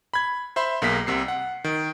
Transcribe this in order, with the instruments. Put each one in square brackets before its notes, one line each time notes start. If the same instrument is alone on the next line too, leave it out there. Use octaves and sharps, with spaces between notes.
[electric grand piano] B5 G#6
C5 E5 B5 C6
B1 A#3 G#4 B6
C2 C3 C7
F#5
D#3